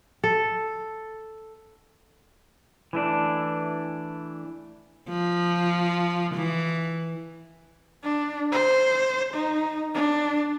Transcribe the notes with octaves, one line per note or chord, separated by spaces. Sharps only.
A4
E3 A3 D4
F3
E3
D4
C5
D#4
D4